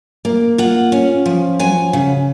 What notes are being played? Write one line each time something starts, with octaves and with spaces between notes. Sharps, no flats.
A#3
F4 F#5
C#4
F3
F#3 G#5
C#3